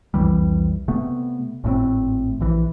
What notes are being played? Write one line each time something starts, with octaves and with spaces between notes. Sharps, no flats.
C2 F2 E3 G3
C3 A3 B3
G#1 A2 C4
A#1 E3